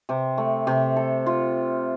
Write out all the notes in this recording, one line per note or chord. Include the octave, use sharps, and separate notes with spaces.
C3
A3
C3
A4
F4